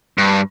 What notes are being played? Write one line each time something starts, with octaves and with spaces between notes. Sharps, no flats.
G2